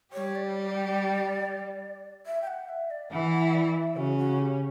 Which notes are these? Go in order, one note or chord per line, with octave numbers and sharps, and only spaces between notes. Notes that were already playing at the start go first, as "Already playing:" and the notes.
G3 G4 C#5
D5
E5
G5
F#5
E5
D5
E3 E4 F#5
F#5
D5
E5
C#3 C#4 F#4
F#4
G4